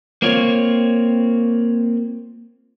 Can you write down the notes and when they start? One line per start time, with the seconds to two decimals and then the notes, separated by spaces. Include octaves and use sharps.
0.22 A#3 C4 F4 C#5